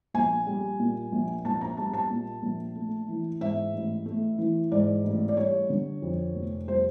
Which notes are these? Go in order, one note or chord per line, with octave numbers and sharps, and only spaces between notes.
A#1 G#5
G3
A#2
A#1
A#1 A5
A#5
G3 A5
A5
A#2
A#1
A3
E3
G#2 E5
A1
A3
E3
G#2 D5
A1
D5
G3 C#5
D3
F2
F1
G3 C5